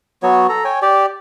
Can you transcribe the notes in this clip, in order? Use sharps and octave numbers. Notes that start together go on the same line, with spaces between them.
F#3 B3 F#4 C#5
A4 A#5
C#5 G5 G#5
G4 D5